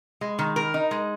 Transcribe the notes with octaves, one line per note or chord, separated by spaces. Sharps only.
G#3
D#3
A#4
D#4
G#3